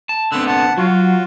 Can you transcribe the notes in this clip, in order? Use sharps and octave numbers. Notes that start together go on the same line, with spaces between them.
A5
D3 B3 C4 E6 F#6
F#5 A5
F#3 F4 F#4